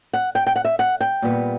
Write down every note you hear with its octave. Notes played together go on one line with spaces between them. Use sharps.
F#5
G5
G5
F#5
E5
F#5
G5
A#2 G3 B3